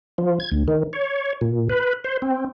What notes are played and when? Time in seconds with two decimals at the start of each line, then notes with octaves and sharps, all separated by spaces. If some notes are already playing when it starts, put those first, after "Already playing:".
0.18 F3
0.40 G#6
0.52 D2
0.68 D#3
0.93 C#5
1.41 A#2
1.69 B4
2.04 C5
2.22 C4